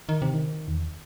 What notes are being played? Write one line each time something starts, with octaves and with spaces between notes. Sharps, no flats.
D#3
C3
D#3
E2